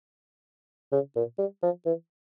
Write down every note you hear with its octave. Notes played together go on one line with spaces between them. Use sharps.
C#3
A#2
G3
F3
E3